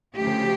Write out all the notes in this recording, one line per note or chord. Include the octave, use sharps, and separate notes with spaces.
D2 C#3 F3 A3 G4